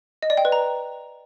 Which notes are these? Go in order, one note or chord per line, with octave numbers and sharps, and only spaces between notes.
D#5
D5
G5
B4
A#5